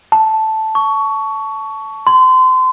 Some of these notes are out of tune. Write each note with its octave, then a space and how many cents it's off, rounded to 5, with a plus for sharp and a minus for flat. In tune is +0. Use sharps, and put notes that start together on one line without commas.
A5 -5
C#6 +15
C6 -30